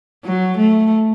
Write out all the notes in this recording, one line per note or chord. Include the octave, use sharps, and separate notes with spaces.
F#3
A3